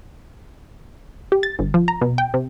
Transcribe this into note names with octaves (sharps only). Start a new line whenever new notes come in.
G4
A6
G1
F3
A#5
B2
G5
C3